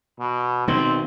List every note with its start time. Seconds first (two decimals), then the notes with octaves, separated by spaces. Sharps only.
0.20 B2
0.68 B2 D#3 C4